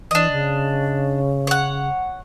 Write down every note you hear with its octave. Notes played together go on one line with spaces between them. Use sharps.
E3 D4 D#5
C#3
C#5 F#5